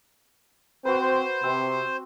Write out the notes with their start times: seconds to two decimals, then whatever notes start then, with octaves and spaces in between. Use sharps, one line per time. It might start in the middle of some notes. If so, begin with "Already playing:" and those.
0.85 C4 F#4 B4 C5
1.43 C3 C4